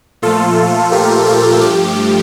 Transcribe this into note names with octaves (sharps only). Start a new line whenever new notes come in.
A#2 F3 A3 F4 A4
G4 A#4
F4 A4
G2 F3 A3 G4